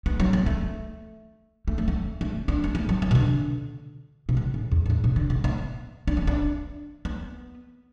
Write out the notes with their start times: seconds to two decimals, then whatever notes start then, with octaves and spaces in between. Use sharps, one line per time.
0.06 B3
0.20 F#3
0.33 B3
0.46 A3
1.68 A3
1.78 F#3
1.88 A3
2.21 A3
2.48 D4
2.64 A3
2.75 B3
2.89 F#3
3.02 E3
3.11 B2
3.15 D3
4.29 B2
4.37 D3
4.54 A2
4.72 E2
4.86 A2
4.90 F#2
5.04 B2
5.16 D3
5.30 B2
5.44 B3
6.07 D4
6.17 B3
6.27 D4
7.05 B3